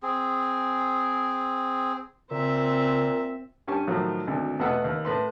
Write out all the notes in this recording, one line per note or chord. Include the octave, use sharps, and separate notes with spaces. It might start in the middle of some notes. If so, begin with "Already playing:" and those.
C4 G#4
A#2 C#3 C4 E5
G2 C#4 G4 G#5 A5 C#6
A2 D#3 F3 F#3
G#1 D2
E2 B2 A3 B4 F#5 E6
D#2
A2 B4 C6